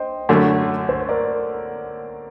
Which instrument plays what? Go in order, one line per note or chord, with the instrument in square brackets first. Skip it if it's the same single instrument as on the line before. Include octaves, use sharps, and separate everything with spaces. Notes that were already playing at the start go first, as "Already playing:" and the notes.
Already playing: [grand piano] C5 D#5 G5
[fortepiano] F#2 D3 A3
[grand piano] C5
A#4 D5